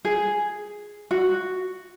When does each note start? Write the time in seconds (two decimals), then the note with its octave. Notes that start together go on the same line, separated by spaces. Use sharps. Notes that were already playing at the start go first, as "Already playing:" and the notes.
0.05 G#4
1.11 F#4